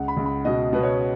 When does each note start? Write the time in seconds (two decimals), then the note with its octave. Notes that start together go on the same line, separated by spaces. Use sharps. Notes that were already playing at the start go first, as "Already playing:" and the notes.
Already playing: C#2 F#5
0.08 B5
0.17 C#2
0.26 B5
0.45 B2 D#5
0.73 B2 B4
0.83 C#5